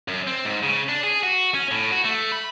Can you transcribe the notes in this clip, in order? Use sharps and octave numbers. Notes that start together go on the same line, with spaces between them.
F#2
C4
G#2
C#3
D4
G#4
F#4
C#4
A2
F#4
A3
B5